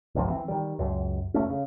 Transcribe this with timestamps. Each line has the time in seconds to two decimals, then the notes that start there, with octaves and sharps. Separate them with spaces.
0.15 G1 C#2 C3 F3
0.28 E3 A3 C4
0.48 D#3 G3
0.79 C#2 F#2
1.34 F1 A3 C#4
1.50 C#3